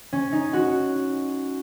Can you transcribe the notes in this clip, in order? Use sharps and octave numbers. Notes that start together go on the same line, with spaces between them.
C#4
D#4
F#4